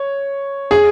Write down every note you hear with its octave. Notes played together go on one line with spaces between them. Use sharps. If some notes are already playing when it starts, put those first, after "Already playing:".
Already playing: C#5
G#4